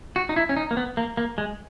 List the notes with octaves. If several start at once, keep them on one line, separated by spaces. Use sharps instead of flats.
F#4
D#4
E4
C#4
D#4
A#3
B3
A#3
A#3
G#3